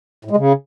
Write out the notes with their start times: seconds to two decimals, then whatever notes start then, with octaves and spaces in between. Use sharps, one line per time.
0.25 A2
0.31 G#3
0.37 C#3